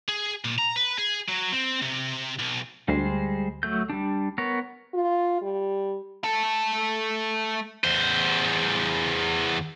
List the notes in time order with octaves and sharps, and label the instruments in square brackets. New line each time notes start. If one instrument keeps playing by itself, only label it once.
[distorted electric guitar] G#4
A#2
A#5
B4
G#4
F#3
C4
C3
B1
[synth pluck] D2 [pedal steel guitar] G3 G#3 C5
[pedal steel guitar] F#3 A3 G6
G3 D4
B3 A#4 C#5
[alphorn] F4
G3
[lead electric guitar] A3 A4
[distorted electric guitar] E2 C5